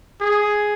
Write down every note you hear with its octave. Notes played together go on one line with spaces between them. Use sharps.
G#4